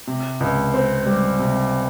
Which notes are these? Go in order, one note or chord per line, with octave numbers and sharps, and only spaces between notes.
C3
C#2
C4
G3
C3